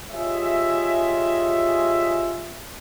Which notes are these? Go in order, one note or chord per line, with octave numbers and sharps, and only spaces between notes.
F4 G4 G#4 C#5 D#5 E5